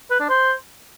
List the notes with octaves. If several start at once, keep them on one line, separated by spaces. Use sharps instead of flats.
B4
D4
C5